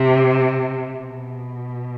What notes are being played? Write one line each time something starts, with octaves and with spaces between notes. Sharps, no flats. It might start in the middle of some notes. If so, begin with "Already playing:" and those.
Already playing: C3
B2